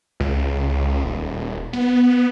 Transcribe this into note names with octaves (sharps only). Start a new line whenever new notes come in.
C#2
D#1
B3